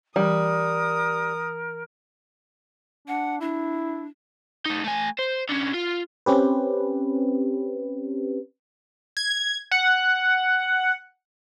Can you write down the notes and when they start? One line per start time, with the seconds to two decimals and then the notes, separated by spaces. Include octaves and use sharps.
0.16 E3 G3 A#4 D#6
3.08 D4 F#5
3.40 D4 E4
4.66 A3 D#4
4.84 A3 G#5
5.19 C5
5.49 D3 C#4
5.74 F4
6.26 C4 C#4 G4 B4
9.17 G#6
9.71 F#5